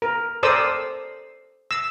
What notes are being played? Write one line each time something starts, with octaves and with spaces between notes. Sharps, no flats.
A#4
A4 A#4 C5 D5 D#6 E6
E6